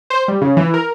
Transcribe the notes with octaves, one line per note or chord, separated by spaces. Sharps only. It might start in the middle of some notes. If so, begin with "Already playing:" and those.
C5
G3
C#3
E3
A#4